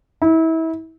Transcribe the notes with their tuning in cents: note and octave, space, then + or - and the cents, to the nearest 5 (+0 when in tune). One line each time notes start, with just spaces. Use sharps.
E4 -30